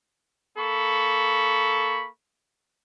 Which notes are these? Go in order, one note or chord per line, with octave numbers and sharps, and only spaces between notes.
A#3 A4 B5 C#6